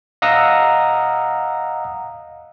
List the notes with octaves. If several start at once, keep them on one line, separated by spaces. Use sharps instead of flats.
D#5 F5 F#5 A#5 D#6 E6